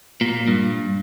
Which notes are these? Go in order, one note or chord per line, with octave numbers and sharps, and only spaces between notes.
A#2
G2